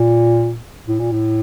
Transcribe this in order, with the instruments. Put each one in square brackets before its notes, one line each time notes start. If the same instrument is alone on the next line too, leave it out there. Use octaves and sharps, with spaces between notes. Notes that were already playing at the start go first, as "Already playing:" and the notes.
Already playing: [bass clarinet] A#2
A2
A#2
A2